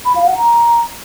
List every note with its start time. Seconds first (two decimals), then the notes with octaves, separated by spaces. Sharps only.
0.05 B5
0.16 F5
0.26 F#5
0.36 A#5